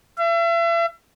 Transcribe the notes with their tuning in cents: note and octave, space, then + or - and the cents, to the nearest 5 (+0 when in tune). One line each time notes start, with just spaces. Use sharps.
E5 +40